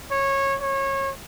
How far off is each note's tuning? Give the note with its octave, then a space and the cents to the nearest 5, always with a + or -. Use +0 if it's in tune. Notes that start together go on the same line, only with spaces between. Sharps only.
C#5 -20
C#5 -25